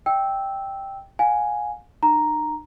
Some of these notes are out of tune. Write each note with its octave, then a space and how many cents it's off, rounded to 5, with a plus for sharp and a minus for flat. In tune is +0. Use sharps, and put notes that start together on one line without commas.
D#5 +0 G5 +0 E6 -10
F5 +35 G#5 +0
D#4 -45 A#5 +0